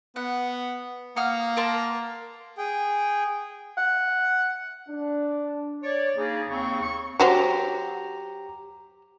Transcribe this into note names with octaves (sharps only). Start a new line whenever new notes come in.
B3 F#5
A#3 F#5 D#6 F6
A#4 A5 C6
G#4 G5
F#5
D4
C#5 D5
C#3 A#3 D#4 G#4
D#2 C#3 C4 C#6
C#6
F#3 F#4 G4 C5 A#5